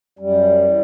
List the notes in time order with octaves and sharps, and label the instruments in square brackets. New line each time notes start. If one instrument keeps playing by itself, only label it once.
[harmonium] F#2 G3
E3